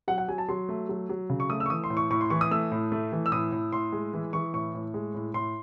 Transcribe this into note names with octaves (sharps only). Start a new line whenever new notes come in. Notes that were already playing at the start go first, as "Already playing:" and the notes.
F#3 F#5
F#5
F#3 G#5
A5
F#3 C6
A3
F#3
F#3
C#3
C#6
A3 D#6
E6
C#6
E3 D#6
C6
A2
C#6
A2 C#6
C6
E3 C#6
D#6
A3 E6
A2
A3
E3
E6
A2 D#6
A2
A2 C6
G#3
E3
E3 C#6
A2 C#6
A2
G#3
A2
A2 C6